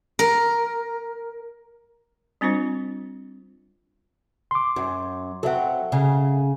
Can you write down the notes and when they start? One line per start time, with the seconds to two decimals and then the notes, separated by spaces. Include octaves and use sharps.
0.19 A#4
2.41 G3 C4 D4 F4 C5
4.51 C6 D6
4.76 F#2
5.43 F#3 C4 A4 E5 F#5
5.92 C#3